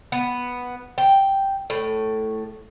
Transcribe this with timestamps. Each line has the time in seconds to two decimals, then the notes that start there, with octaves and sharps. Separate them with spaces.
0.12 B3
0.98 G5
1.70 A2